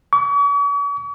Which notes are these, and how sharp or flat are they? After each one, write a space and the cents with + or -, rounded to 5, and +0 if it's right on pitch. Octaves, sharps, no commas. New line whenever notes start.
C#6 +45